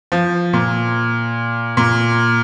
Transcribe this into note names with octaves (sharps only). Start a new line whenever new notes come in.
F3
A#2
A#2